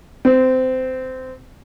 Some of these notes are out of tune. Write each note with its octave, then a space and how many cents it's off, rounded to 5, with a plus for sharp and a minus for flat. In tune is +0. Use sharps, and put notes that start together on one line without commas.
C4 -20